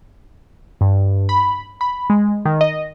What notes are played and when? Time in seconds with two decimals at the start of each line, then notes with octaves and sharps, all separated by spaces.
0.81 G2
1.29 B5
1.81 B5
2.10 G#3
2.45 D#3
2.61 D#5